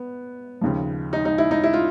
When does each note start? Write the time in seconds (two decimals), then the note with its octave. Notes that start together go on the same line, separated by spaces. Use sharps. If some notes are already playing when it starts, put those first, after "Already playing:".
Already playing: B3
0.61 D#2 C#3 F3
1.13 D#4
1.25 D#4
1.38 E4
1.51 D#4
1.63 E4
1.73 F4